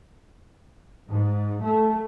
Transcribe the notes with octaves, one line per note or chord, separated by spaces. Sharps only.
G#2
A3